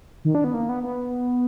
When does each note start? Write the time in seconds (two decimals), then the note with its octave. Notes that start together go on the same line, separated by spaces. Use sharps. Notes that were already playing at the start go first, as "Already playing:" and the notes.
0.25 D#3
0.35 D4
0.44 B3
0.54 A#3
0.69 B3
0.83 B3